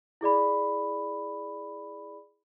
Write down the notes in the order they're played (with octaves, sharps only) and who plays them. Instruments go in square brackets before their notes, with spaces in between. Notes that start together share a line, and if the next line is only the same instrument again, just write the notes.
[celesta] E4 G#4 D5 B5